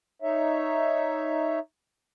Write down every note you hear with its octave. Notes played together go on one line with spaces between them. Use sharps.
D#4 C#5 E5